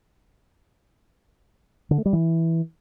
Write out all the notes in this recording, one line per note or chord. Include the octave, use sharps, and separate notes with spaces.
D3
A3
G3
E3